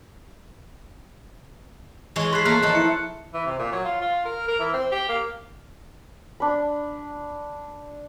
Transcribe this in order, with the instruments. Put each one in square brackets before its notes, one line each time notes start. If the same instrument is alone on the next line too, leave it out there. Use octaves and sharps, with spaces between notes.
[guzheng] E3 G#3 C#5
[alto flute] G#4 [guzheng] B4 A5 [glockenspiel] C6 F#6 C7
[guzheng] A3 A#4 [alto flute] A#3 [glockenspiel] F#6
[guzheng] F3 A4 [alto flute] D#5
[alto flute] E4 [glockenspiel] C#7
[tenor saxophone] E3
C3
A#2
F#3
F4
F4
A#4
A#4
E3
C4
G4
A#3
[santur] D4 B5